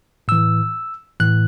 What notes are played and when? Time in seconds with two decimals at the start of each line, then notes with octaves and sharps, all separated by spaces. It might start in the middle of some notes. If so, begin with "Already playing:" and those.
0.28 A2 E3 E6
1.20 A2 E3 F#6